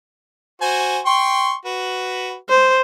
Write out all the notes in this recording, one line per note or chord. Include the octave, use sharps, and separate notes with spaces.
F#4 C5 G#5
G5 C6 C#6
F#4 B4
C5